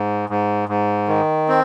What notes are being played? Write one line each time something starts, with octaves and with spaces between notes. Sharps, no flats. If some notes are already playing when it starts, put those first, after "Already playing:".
Already playing: G#2
G#2
G#2
D#3
C4